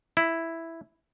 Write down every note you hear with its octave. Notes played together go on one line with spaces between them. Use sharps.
E4